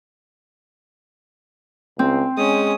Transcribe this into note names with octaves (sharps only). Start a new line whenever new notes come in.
C#2 C4
G#3 C#4 D#6